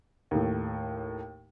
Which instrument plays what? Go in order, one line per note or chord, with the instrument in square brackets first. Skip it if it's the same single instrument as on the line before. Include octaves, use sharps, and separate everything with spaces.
[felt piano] D#2 A2